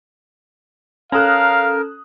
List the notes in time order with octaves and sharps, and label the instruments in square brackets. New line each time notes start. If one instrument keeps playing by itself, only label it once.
[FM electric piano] C#4 A4 [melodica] A#4 [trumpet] F5 [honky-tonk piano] A#5 D#6 F#6